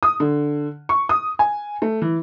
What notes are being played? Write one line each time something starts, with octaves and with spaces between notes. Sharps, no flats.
D#6
D3
C#6
D#6
G#5
A3
E3